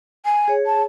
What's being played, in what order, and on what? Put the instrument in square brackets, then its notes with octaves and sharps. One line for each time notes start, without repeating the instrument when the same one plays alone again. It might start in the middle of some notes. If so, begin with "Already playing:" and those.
[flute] G#5
[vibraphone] G#4 C#5
[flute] A5